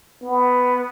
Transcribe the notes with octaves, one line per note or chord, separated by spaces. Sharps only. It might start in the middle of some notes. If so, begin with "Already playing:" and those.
B3